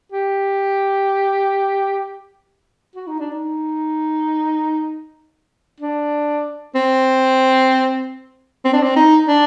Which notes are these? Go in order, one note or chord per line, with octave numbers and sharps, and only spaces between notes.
G4
F#4
D#4
D4
D#4
D4
C4
C4
D4
C4
D#4
D4